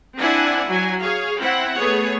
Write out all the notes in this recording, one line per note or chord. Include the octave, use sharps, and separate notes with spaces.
C4 D4 E4 D5 F#5 G#5
F#3 G#5
G#4 C#5 F5
C4 E4 F#5
A3 B3 G#4 C#5